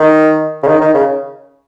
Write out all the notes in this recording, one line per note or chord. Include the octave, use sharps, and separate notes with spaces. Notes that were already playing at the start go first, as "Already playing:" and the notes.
Already playing: D#3
C#3
D#3
D#3
C#3